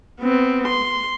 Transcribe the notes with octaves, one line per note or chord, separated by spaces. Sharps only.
B3 C4
C6